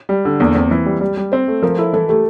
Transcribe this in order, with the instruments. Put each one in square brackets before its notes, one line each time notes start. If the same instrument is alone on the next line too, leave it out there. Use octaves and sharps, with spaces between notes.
[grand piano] G3
D3
[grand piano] E2 [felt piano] A#3
[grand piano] E2 [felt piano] C4
[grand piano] E3
G3
G3
G3
[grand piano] C4 [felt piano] C5
[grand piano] A3
[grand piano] F3 [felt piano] A#4
[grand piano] E4 [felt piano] A4
[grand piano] E3 [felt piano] A4
[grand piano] A3 [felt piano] G4